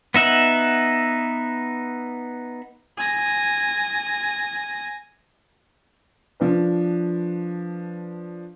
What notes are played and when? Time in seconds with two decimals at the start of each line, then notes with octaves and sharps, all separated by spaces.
0.14 B3 D#4 E5 F#5
2.97 G#5 A#6
6.40 F3 D4 B4